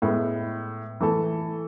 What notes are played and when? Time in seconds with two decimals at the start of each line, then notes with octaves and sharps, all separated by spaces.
0.02 A2 G#3 B3
1.01 E3 A3 E4 A4